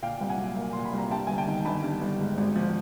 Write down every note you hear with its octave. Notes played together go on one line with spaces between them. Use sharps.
A#2 F5 G5
C2
F#5 G#5
F#3
A#3
A#2 C6
B5
C2
A#5
G2 G5 A5
G1 G#5
G5 A5
D#3
G1 A5 B5
G2
G1
G#2
G#1
F3